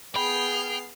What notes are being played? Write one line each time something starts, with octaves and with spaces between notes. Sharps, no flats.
B3 G#4 G5 B5 F6 C7